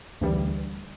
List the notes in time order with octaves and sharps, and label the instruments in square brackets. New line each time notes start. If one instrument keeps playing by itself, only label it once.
[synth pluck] D2 E3 G3